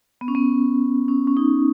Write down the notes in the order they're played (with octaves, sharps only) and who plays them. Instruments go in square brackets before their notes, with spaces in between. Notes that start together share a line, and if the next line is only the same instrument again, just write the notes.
[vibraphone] B3
C#4
B3
C#4
C#4
D#4